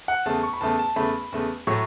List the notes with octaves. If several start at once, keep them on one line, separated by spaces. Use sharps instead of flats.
F#5
E2 C#3 A3 A5
C#6
B5
E2 C#3 A3 A5
A5
E2 C#3 A3 B5
E2 C#3 A3
A2 F#3 A3 C#6